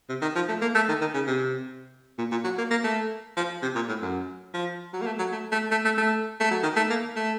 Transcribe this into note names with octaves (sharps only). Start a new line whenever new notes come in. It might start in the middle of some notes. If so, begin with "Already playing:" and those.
C3
D#3
F3
A3
A#3
A3
D#3
D#3
C#3
C3
A#2
A#2
F#3
A#3
A#3
A3
F3
C3
A#2
A2
F#2
F3
F#3
A#3
A3
F#3
A3
A3
A3
A3
A3
A3
F#3
D#3
A3
A#3
A3